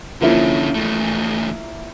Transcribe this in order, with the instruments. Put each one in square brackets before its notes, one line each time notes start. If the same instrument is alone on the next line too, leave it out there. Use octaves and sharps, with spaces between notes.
[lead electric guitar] D3 C#4 [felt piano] F3 A#3 E4
[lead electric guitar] E2 A3